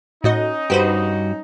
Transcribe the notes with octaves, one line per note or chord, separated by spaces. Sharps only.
A2 C#4 D#4 F#4 D#5
G2 G3 F#4 G4 B4 C5